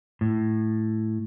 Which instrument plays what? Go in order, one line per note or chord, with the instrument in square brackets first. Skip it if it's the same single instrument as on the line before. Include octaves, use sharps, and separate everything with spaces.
[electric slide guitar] A2